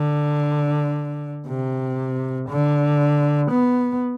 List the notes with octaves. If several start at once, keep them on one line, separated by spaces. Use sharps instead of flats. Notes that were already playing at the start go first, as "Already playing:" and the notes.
Already playing: D3
C3
D3
B3